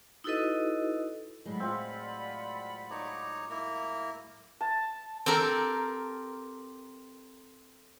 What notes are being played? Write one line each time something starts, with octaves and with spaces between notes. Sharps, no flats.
D#4 E4 F#4 A4 B4 D#5
A2 F#3 G#3 D5 F#5 B5
C4 F4
D#4 C#5 A#5 C#6 D6
A#3 E4 A#5
A5
C4 G4 A4 A#4